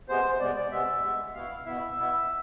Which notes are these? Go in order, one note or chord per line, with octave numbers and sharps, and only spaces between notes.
C3 G#3 B3 C5
C3 G#3 B3 D5
D5
C3 G#3 B3 E5
C3 G#3 B3
B2 B3 E4 F5
B2 B3 E4 E5
B2 B3 E4